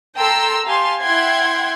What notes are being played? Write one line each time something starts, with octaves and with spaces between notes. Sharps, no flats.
A4 G5 A#5 C6 E6
G4 F5 G#5 A5 C6
E4 E5 F#5 G5 C6 G#6